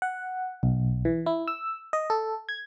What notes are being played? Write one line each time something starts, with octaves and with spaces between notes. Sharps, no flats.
F#5
B1
E3
E4
E6
D#5
A4
G#6